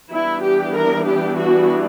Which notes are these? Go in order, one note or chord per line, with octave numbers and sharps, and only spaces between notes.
E3 G3 B3 D4 E4
G4
A#4
G4
F#4